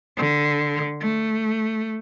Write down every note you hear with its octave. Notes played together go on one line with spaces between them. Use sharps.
D3
A3